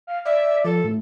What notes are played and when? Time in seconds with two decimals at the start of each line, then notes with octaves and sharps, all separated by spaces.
0.07 F5
0.26 D5 E5
0.65 F3 A4
0.84 A2